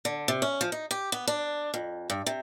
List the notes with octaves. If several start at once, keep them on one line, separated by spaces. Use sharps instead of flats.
D3
C3
C#4
F3
D#4
G4
B3
D4
F2
G2
C3